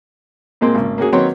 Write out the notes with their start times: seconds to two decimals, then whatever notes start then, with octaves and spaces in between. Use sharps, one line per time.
0.61 A#2 G#3 A#3 C4
0.75 G#1 C#3 A#3
0.98 A#3 C#4 F#4 G#4
1.12 D#3 F#3 A#3 C4 B4 C#5